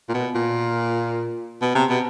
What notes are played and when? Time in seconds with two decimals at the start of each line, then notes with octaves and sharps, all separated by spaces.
0.09 A#2
0.14 B2
0.35 A#2
1.62 B2
1.75 C3
1.90 B2